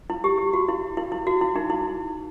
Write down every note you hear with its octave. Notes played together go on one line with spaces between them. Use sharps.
E4
G4
G4
F#4
E4
E4
E4
F#4
E4
D#4
E4